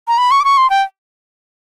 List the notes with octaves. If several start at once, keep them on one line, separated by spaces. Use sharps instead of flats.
A#5
B5
C#6
D6
C#6
C6
G5